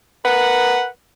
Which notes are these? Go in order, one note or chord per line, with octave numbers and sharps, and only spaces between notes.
A#4 B4 F#5